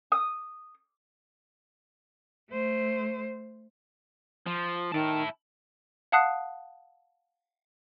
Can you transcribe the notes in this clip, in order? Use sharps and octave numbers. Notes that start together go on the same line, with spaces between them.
D#6
A3 C5
F3
D#3 E4 A5
F5 F#5 A5 D#6 F#6 C7